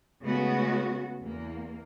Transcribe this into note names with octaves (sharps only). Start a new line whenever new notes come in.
C#3 G#3 A3 B3 F#4
E2 A#3